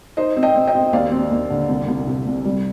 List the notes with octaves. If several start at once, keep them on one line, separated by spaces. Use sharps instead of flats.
D#4 C5 D#5
C4
D#5 G5
C4
D#5 G5
C4
D#2 D5 F5
C4
D#2
D3
C2
C2
C3
C2
G3